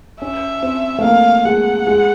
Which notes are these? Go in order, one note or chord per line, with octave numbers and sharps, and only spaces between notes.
C#4 E5
C4
A3
A#3 F5
G#3 F#5
G#3